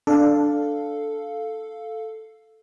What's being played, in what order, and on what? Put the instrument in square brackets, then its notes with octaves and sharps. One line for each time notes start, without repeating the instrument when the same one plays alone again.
[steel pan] D4 [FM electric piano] A4 F5